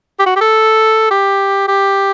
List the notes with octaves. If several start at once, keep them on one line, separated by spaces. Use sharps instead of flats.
G4
F#4
G4
A4
G4
G4